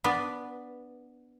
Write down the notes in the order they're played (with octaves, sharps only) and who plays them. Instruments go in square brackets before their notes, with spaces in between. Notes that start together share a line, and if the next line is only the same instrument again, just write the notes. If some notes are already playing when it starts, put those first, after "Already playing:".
[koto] B3 D4 B4